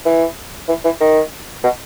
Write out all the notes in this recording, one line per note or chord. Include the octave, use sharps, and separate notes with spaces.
E3
E3
E3
D#3
B2